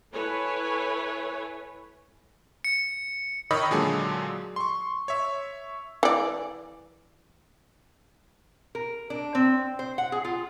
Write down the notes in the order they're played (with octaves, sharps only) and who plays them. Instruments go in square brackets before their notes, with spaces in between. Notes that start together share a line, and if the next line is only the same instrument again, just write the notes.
[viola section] E4 A4 B4 C#5 G#5
[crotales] C#7
[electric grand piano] D#3 C#5 D#5 B5 D#6 E6
A#2 D3 F#3 G#3 G#4 A4
C6 C#6
C#5 E5
[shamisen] E3 D5
[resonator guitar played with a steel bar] A#4
D4
C4
C5
F#5
G#4
F4